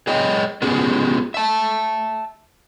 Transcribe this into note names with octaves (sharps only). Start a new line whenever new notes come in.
G#4 C#5 D#5 G5
B3 C#4 F4 G4 G#4
E5 A5